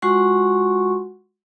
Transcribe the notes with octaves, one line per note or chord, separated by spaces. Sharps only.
G#3 F4 F#4 F#5 C6 C#6